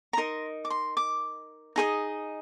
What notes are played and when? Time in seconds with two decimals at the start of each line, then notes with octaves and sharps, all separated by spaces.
0.13 A#5
0.17 D#4 A#4 D#5 C6
0.65 D6
0.70 C6
0.97 D6
1.76 D#4 G#4 C5 D#5